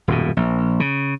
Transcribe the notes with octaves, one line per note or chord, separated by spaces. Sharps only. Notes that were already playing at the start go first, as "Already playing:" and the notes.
D#1 F#2 B2
A#1
C#3